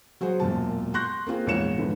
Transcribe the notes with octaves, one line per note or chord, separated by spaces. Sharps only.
F#3 F#4 G#4 C5
E1 F#2 A#2 A5
C6 C#6 F#6 G6 A#6
A#3 C4 F4 G#4
A#1 E2 G#2 C#5 C#7 E7
G#2 D3 E3 F3 B3